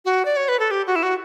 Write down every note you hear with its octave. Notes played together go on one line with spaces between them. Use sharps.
F#4
D5
C#5
B4
A4
G4
F#4
E4
F#4